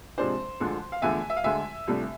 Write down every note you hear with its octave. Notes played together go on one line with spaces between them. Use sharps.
C3 F3 G#3 D4 C5
D2 D3 F3 G#3
F5
E2 D3 F3 A3 E5 G#5
E5
F5
D2 D3 G#3 E5 G#5
C2 C3 F3 A3 D4